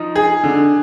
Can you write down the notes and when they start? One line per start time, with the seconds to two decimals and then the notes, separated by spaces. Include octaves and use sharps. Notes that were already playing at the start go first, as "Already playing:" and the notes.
Already playing: F3 D#4
0.16 G#4
0.44 D3